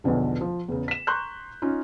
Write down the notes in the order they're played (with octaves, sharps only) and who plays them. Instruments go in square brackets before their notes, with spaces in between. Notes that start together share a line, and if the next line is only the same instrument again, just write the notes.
[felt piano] B1 E2 B2 D3 F3
F3
E2 C#3
B6 E7
A#5 C6 C#6 F#6 G6
C#4 D#4 F4